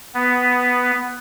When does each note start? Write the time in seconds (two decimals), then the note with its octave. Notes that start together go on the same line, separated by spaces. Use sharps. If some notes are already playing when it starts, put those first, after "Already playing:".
0.14 B3